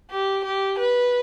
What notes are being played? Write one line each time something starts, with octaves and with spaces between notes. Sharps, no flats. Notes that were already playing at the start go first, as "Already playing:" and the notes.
G4
G4
B4